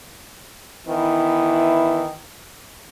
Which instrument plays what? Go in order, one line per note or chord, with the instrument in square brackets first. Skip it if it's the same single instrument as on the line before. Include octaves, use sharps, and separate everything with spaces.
[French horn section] D#3 E3 B3 E4